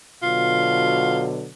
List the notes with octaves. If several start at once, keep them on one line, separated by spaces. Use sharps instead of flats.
B2 D3 F#3 F4